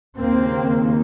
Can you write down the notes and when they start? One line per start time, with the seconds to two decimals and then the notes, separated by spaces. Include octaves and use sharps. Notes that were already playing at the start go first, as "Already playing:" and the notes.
0.18 D#2 C#3 A#3 C4